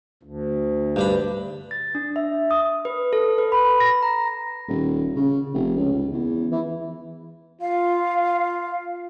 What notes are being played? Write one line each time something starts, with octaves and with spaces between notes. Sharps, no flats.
D2
G2 D4 B5
A6
D4
E5
D#6
B4
A4
B4
B5
A#6
A#5
D#1
C#3
F1
C#2
E2
E3
F4 F5